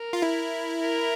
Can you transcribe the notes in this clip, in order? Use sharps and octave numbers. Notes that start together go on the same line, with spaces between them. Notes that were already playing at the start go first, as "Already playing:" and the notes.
Already playing: A#4
F4
E4
A#4